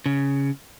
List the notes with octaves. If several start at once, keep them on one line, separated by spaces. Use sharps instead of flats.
C#3